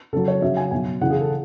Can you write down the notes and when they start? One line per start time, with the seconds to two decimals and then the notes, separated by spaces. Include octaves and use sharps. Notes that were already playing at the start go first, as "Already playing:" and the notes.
0.13 C#3 F#3 A4
0.28 C#5
0.42 C#3 F#3 E5
0.57 G#5
0.71 B2 F#3 G#5
1.01 C#3 E3 F#5
1.10 G#4
1.21 A4